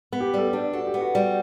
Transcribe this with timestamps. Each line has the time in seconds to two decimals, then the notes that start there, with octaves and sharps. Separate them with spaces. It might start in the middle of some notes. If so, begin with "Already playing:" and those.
0.13 B3
0.20 G4
0.34 G3 A4
0.47 G4
0.53 D4
0.73 F#4 A4
0.87 G4
0.94 B3
1.01 F#4
1.15 G3